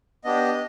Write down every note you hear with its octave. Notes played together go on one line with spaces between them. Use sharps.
B3 D4 G4 D#5